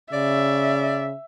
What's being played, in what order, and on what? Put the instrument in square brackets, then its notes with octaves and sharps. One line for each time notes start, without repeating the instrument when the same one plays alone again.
[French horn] C#3 [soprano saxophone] D5 [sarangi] E5